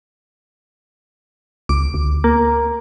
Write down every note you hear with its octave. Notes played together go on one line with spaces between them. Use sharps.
C#2 D6
D2
A#3